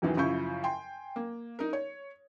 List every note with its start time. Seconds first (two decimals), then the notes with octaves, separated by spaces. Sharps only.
0.02 E2 B2 D#3 E3 F#3
0.17 F#2 C#3 F3 E4 C#6 G6
0.64 G5 G#5 C6
1.16 A#3
1.59 D#4 A#4
1.73 C#5